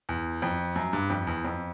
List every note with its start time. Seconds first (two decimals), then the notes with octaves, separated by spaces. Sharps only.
0.09 E2
0.42 F2
0.76 F#2
0.93 G2
1.10 F2
1.27 E2
1.45 F2